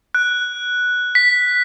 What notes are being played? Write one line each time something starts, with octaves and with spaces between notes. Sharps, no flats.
F#6
B6